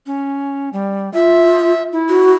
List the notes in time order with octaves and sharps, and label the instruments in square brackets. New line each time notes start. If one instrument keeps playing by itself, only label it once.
[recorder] C#4
G3
[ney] F4 [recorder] E5
[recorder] E4
[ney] F#4